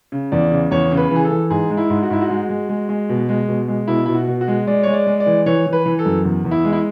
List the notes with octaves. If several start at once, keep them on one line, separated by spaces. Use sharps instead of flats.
C#3
E2 D5
C#3
E2 C#5
C#3
B4
E3 G#4
A4
E3
G#2 G#4
G#3
E4
G#2
F#4
G#2 E4
F#4
G#3
G#3
G#3
G#3
B2
G#3
B2
G#3
B2 E4
B2 E4
F#4
B2
F#4
G#3
G#3 D5
G#3 C#5
D5
G#3
D5
E3
E3 C#5
E3
B4
E3
A4
F#2
E2
E2
E4
G#3
E4